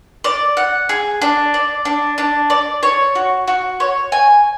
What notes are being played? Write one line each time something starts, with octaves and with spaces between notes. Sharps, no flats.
D5
F#5
G#4
D4
D5
D4
D4
D5
C#5
F#4
F#4
C#5
G#5